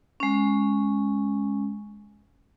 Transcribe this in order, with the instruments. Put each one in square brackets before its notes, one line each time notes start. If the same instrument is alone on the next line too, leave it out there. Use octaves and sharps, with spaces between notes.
[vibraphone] G#3 C#4